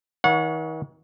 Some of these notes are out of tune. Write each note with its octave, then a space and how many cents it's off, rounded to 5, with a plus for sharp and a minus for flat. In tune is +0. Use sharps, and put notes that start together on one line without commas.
D#3 +40 C#5 +25 F#5 -35